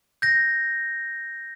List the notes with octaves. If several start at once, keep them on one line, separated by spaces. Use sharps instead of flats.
G6 A#6